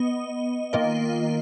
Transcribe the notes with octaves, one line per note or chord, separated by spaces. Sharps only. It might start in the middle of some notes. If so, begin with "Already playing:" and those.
Already playing: B3 D#5
D#3 A#3 F4 A#4 D#5